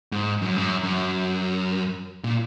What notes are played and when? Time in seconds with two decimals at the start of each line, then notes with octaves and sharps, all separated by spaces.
0.12 G#2
0.42 F#2
0.57 G#2
0.62 F#2
0.83 F#2
2.24 A#2